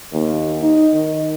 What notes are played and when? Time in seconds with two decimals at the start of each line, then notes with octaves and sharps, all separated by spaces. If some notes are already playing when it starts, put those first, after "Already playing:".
0.13 D#2
0.61 D#4
0.93 D#3